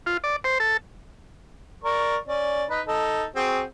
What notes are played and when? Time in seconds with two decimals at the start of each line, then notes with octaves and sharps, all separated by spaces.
0.06 F4
0.24 D5
0.44 C5
0.60 A4
1.84 A#4 D5 C#6
2.27 C#4 D5
2.70 D#4 B4
2.87 D#4 A4
3.36 C4 F#4 G#4